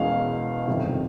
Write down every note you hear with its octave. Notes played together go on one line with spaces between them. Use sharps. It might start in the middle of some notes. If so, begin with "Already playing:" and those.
Already playing: E1 E2 B2 G#3 C#4 F5
G1 F2 C3 D#3